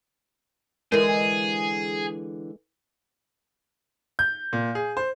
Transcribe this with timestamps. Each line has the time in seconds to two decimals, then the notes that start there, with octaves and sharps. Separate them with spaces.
0.92 D3 E3 G#3 G#4 A#4
4.19 G6
4.53 A#2
4.75 G#4
4.97 C5